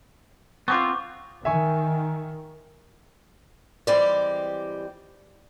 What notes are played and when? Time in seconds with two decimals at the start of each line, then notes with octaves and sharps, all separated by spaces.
0.68 B3 C4 F4 C#6 D6
1.45 D#3 E5 G#5 C#6
3.87 E3 G3 G#3 C4 G4 D5